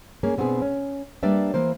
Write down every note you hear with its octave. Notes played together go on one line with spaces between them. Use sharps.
A#3 C#4 G#4
B2 B3 C4 D4 G#4
C#4
G3 A#3 D4 B4 D5 E5
E3 A#3 C5